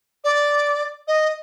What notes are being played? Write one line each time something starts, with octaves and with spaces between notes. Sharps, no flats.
D5
D#5